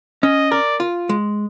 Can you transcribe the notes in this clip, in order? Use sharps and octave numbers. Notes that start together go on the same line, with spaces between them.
C#4 D#5
A#4 D5
F4
G#3